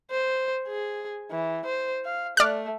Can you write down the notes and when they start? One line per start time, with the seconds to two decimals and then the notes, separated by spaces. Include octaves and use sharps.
0.10 C5
0.67 G#4
1.31 E3
1.66 C5
2.05 F5
2.37 A3 D5 F6 F#6